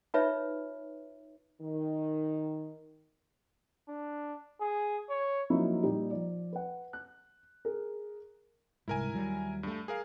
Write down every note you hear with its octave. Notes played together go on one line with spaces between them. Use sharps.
D#4 F4 B4 C#5 E5
D#3
D4
G#4
C#5
F3 F#3 A#3 D#4 E4
A#2 G3 D#4 G4
F3 D5
B4 F#5
F#6
G#4 A#4
C2 G#2 E4 A#4 G#5
D#2 F#3 G3
G2 A3
G#4 A#4 F5